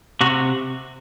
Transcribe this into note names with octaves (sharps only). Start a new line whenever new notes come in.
C3 F#4